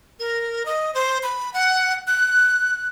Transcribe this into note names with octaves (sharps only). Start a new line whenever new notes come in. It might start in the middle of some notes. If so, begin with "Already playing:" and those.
A#4
D#5
C5
B5
F#5
F#6